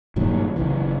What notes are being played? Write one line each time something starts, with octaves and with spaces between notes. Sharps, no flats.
G2 A#2 D#3 F#3
F#1 B1 C#3 E3